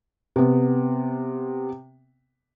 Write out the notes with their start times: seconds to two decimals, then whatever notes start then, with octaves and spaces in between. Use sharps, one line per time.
0.36 C3 B3